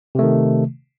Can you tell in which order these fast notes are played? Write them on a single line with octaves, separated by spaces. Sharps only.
C3 A3 D#3